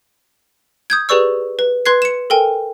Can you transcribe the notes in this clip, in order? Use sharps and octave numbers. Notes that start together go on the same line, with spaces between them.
D#6 G6 G#6
G4 G#4 B4 D5 C#6 E6
B4
B4 C6 F#6 G#6 C7
C#7 E7
A4 A#4 G5 G#5